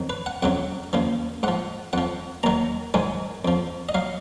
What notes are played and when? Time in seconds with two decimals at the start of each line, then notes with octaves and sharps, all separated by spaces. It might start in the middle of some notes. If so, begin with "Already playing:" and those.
Already playing: F2 D#3 F#3
0.10 B4
0.26 F#5
0.43 F2 C#3 F#3 F#5
0.93 D#2 C#3 F3
1.43 G#2 F3 F#5
1.93 F2 F3 F#5
2.43 D#2 D#3 F#3 A#5
2.94 G#2 D#3 F#3 G#5
3.45 F2 F3
3.89 D#5
3.94 F#3 F5